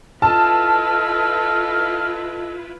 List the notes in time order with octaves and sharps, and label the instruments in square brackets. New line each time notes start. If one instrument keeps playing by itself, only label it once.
[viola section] E4 F4 B4 [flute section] A4 D#5 E6 [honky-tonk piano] A5 [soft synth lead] F6